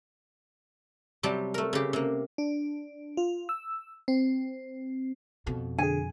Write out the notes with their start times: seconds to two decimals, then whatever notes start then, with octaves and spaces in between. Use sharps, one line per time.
1.23 C3 F#3 G3 G4 A5
1.54 A3 A#4
1.73 C#3 G4
1.93 C3 A#3
2.38 D4
3.17 F4
3.49 E6
4.08 C4
5.47 F2 B2
5.78 D3 G#4 G#5